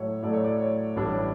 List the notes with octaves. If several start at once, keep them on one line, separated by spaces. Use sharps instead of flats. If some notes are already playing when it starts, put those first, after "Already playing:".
Already playing: A2 F#3 A3 C#5
A2 F#3 A3 D5
C#5
D5
C#5
A1 A2 G3 D4